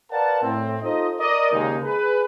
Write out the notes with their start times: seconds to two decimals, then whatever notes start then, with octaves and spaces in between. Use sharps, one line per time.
0.11 A#4 B4 D5 F5 F#5 A5
0.43 A2 C4
0.82 D#4 F4 A4 C5 D#5
1.20 A#4 D5 D#5
1.52 D#2 C#3 G#3 D#4
1.84 G#4 B4